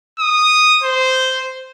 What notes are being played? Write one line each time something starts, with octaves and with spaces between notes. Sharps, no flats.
D#6
C5